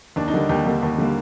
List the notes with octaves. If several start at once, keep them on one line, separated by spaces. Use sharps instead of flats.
D#2 D4
D#4
D3 G3 A#3
D#2 G4
D3 G3 A#3
D#2
D3 G3 A#3